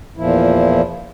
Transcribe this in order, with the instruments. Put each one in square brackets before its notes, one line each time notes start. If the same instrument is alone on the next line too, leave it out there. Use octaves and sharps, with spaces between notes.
[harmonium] E2 A#2 F3 E4